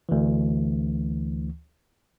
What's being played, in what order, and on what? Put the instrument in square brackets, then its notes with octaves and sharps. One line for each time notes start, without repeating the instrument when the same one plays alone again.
[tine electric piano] D2 E3